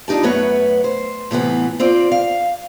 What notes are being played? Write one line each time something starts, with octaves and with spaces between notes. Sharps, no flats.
F2 D4 D#4 G4 A5
F#2 A3 B3 B4 C#5 F#5
C5
A2 C3 E3 B3
C4 F4 C5 D5
F5